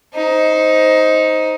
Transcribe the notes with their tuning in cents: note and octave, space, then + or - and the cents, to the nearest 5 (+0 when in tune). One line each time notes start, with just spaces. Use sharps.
D#4 +10 C5 +0